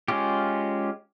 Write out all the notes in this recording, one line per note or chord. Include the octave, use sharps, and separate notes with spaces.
G#3 C#4 F4 G4